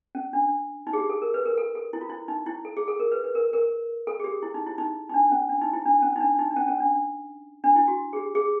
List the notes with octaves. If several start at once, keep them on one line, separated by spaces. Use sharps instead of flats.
C#4
D4
D#4
G#4
G4
A4
A#4
B4
A#4
A4
A4
E4
F4
E4
D#4
E4
A4
G#4
A4
A#4
B4
B4
A#4
A#4
A4
G#4
G4
E4
D#4
E4
D#4
D#4
D4
C#4
D4
D#4
E4
D4
C#4
D#4
D4
D#4
D4
C#4
C#4
D4
D4
E4
F#4
G#4
G4
G#4